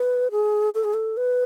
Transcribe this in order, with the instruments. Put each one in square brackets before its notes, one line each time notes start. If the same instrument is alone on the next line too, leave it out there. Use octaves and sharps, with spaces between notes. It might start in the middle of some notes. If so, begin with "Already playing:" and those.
Already playing: [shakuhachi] B4
G#4
A4
G#4
A4
B4